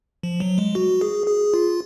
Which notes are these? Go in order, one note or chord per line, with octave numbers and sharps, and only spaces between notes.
F3
F#3
G#3
F#4
G#4
G#4
F4